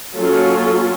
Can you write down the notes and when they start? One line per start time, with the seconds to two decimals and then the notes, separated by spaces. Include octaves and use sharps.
0.16 F#3 A#3 C#4 F4 A4